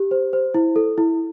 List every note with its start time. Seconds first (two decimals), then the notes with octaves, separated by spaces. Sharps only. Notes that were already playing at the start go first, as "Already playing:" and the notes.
Already playing: G4
0.11 C5
0.33 C5
0.54 E4
0.76 A4
0.98 E4